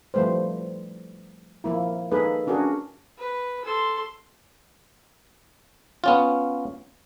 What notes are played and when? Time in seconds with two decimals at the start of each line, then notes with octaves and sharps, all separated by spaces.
0.14 F3 G3 A3 B4 C5
1.64 F3 A#3 E4
2.12 A#3 D#4 G#4 A4 B4
2.47 C#4 D4 F#4 G#4 A#4
3.18 B4
3.65 A4 C6
6.04 B3 C#4 F4